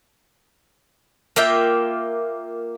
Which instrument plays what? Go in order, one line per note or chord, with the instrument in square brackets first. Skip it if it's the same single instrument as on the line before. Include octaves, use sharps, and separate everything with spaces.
[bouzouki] A#3 F4 E5 G5